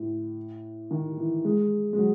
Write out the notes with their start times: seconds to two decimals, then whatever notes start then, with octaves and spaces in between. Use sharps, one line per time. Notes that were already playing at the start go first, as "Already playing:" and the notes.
Already playing: A2
0.91 D#3
1.18 E3
1.45 G#3
1.93 G#3
1.98 F#3